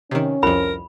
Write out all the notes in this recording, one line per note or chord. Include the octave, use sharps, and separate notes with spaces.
C3 D#3 C#4
C2 F2 A#4 B5